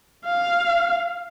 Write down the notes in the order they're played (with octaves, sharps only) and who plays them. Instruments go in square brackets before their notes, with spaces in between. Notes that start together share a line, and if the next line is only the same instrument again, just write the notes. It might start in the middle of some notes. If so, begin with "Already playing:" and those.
[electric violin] F5